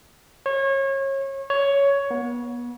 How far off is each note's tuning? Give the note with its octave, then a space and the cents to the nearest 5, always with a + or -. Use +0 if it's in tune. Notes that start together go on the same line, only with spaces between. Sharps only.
C#5 -30
C#5 +10
B3 -35